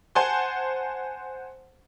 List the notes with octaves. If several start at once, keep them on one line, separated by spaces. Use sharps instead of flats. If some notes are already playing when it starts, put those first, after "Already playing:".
C5 F#5 G#5 A5 C6